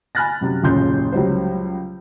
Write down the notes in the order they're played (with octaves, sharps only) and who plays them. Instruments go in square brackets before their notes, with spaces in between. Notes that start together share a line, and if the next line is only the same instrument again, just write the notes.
[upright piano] G#5 B5 F6 F#6 A6 A#6
F#2 C3
F#1 D#2 A#2 C#3 C6 G6
C#2 F#3 G3 C5